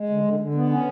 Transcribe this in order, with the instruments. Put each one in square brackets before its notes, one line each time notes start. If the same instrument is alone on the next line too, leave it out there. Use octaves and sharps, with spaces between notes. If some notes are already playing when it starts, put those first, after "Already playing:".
Already playing: [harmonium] G#3
D3
D3
D3
B3
C#4